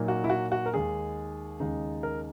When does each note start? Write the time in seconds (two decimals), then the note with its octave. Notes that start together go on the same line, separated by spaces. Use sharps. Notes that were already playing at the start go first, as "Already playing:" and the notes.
Already playing: A#2 F#3 A#3 D#4
0.08 F#4
0.24 E4
0.30 F#4
0.52 F#4
0.66 A#4
0.73 D#2 D#3 G#3 G#4
1.60 D#2 C#3 G#3 D#4
2.03 A#4